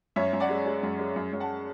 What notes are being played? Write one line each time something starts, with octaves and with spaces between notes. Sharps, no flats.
F#2 C#5 E5
F#2
D5 F#5
G#3
G#3
F#2
G#3
F#2
F#2
F#5 A5